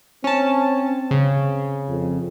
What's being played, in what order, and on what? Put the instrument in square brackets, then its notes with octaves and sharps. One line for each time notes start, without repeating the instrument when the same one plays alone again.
[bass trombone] C4 [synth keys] C#4 A5
[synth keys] C#3
[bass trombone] F2